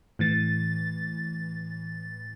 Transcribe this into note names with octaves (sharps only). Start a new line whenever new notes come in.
A2 E3 A6